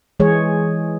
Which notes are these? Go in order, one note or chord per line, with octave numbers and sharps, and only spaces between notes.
E3 G#3 G#4 C#5